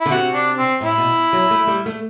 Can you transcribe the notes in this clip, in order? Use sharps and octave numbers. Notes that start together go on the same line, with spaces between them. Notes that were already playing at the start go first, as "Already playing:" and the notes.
E4
D3
C3 F#4
D4
C4
A2 E4
B2
F#3
A3
G3
A3